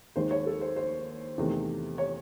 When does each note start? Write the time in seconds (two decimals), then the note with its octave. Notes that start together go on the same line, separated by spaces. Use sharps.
0.16 D#2 D#3 G#3 C5
0.31 C#5
0.46 A4
0.61 C5
0.76 C5
1.38 E2 C3 D#3 A3
1.98 C#5